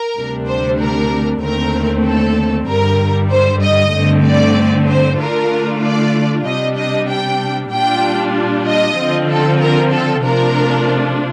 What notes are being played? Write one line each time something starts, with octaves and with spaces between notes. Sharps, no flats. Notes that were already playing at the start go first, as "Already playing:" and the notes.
Already playing: A#4
D2 C3 G3 D4
C5
A#4
D#2 D3 A3 C4 A#4
A4
G2 D3 G3 A#4
C5
D#5
G2 D3 A3 C4
D5
C5
D3 A3 D4 F4 A#4
D5
C3 G3 D4 D#5
D#5
G5
A#2 G3 D4 F4 G5
D#5
D3 F3 C4 F4
A4
A#4
A4
C3 F3 A3 D4 F4 A#4